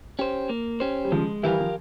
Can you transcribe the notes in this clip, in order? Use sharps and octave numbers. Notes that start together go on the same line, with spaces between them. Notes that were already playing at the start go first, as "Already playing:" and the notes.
C#4 G4 C5
A#3
C#4 G4 C5
G3
C#3 F3 G#3
E3 G3 E4 G4 A#4 F5
F3